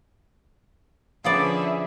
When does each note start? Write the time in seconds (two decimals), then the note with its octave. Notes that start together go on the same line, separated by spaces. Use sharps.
1.24 D3 F3 B3 C#4 G#4 B4 D5 E5